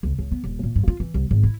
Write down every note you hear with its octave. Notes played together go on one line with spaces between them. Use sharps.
C#2
C#2
B3
D#1
A#2
G2
F4
E3
C2
G#1
E4